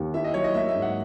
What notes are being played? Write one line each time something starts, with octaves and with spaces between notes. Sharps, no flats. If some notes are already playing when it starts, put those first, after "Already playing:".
Already playing: D#2
E4 E5
D#5
F#3 C#5
D#5
A#3 E5
E5
G#2
F#5